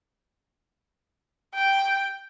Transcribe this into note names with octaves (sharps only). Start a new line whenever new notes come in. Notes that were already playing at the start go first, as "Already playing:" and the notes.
G5